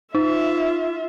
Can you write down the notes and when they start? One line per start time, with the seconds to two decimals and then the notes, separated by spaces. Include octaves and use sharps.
0.15 D#4 F4 E5